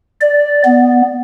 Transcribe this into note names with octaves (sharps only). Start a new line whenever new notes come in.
D5
B3